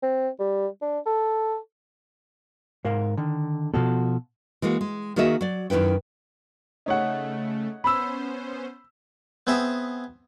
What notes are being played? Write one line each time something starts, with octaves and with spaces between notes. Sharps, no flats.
C4
G3
D4
A4
G#2 A#4 F5
D3 D#3
B2 F3 B3 F#4 A4
E3 G#3 A#3 F#4
G#3
D#3 A#3 F#4 G#4 D#5 E5
F#3 D5
F#2 D#3 E4 B4 G5
C#3 A3 D#4 C#5 F#5
B3 C#4 C5 B5 E6
B3 C4 G#4 D#5 E5